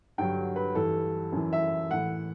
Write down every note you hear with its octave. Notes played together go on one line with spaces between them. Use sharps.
G2 D3 F#3 G5
B4
G2 E3 A4
F#2 E3
E5
A2 E3 F#5